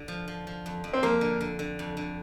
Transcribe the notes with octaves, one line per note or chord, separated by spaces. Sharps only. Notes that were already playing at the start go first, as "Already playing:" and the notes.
Already playing: D3
F3
F3
F3
F2
F2
C4
F2 A#3
D3
D3
D3
F2
D3